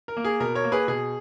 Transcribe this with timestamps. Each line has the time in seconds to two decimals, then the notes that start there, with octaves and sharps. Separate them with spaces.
0.08 A#4
0.17 A#3
0.25 G#4
0.40 B2 A#4
0.55 A#4 C#5
0.64 A#3
0.72 G#4 B4
0.88 B2 G#4